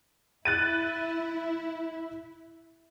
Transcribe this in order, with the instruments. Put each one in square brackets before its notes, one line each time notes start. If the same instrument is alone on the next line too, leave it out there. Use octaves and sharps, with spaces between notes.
[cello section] E4 [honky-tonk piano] F#6 A6 D#7